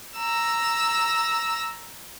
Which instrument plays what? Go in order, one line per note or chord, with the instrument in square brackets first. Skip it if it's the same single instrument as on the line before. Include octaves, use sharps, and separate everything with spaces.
[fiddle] A#5 E6